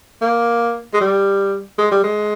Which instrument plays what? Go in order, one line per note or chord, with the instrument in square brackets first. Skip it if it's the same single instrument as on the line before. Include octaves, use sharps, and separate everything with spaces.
[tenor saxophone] A#3
G#3
G3
G#3
G3
G#3